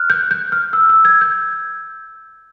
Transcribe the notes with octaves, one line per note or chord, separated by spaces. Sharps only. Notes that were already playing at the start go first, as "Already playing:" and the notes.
Already playing: F6 F#6
G6
G6
F6
E6
E6
G#6
G6